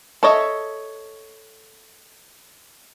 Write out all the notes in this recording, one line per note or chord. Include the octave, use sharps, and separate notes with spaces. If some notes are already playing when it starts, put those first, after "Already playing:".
A4 C#5 D#5 E5